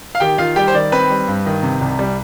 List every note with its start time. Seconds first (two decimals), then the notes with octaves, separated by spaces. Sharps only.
0.15 F5
0.20 D#3 G4 G5
0.38 D#3 F4 F5
0.56 G3 G4 G5
0.68 C5
0.74 D#3 D5
0.92 C4 B4 B5
1.10 G3
1.28 G2
1.46 D#3
1.63 C3
1.81 C2
1.99 G3